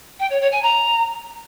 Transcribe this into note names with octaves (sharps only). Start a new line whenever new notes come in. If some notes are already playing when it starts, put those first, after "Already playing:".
G5
C#5
C#5
G#5
A#5